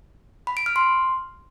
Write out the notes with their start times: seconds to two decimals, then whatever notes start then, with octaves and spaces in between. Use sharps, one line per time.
0.47 B5
0.57 D7
0.66 F6
0.76 C6